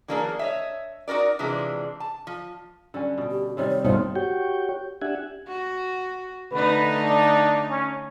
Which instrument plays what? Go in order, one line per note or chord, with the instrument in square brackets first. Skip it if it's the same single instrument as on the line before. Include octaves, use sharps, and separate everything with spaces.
[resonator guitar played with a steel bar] E3 F#3 A#3 D4 G#4 A#4
C#5 D#5 E5
D#4 F#4 G4 A#4 D5
C3 E3 F3 G#3 D4
A5
F3
[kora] D3 G3 C#4
B2 G5
[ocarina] G4
[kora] C3 D#3 G3 [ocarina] C#5
[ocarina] C#5
[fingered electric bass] G2 B2 [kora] D#3 A3 F4 [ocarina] C5
[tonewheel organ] F#4 G4 C#5 G5
D4 G4 E5 F#5 G#5
[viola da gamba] F#4
[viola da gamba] D3 A3 D#4 [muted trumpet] B4
[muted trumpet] D4
C#4